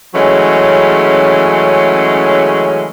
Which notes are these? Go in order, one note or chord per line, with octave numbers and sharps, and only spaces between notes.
C#3 E3 F#3 G#3 A3 C#4